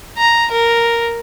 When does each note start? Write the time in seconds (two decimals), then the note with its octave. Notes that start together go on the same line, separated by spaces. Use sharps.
0.18 A#5
0.51 A#4